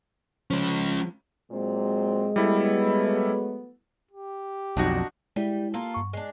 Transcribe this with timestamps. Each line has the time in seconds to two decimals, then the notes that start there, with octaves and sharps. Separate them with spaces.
0.51 F3 G#3 C#4
1.52 A#2 F#3 G#3 C4
2.36 F#3 G3 A3 B3 E4 A4
4.11 G4
4.77 B1 F2 D4 D#4 F#4
5.36 G3 G#3 E4
5.74 A#3 F4 A4
5.94 G2 C#6
6.13 G#3 D4